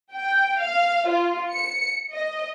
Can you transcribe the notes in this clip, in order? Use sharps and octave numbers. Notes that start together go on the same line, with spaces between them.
G5
F5
F4
C#7
D#5